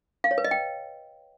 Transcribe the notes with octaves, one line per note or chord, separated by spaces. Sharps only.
F5
C#5
B4
D#5
G5